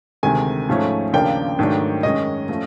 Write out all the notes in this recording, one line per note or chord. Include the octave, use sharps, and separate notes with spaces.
D2 C3 D#3 G#3 G#5
G#2 F3 A3 C#4
D#2 C#3 F3 A#3 D4 G5
G#2 D#3 F#3 A3 D4
F#2 D#3 G#3 C#4 D#5
F3 A3 C#4